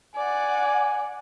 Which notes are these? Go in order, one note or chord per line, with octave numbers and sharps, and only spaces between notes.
D5 F#5 G#5